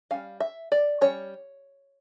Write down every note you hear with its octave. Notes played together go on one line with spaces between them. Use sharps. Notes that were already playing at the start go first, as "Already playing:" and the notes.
G3 C#4 F5
E5
D5
G3 C#4 C#5